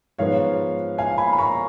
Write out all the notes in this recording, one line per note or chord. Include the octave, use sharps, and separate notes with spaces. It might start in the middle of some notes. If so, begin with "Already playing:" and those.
G#2 F3 B3 C#5 F5
F5 G#5
G#5 B5
B5
A#5 C#6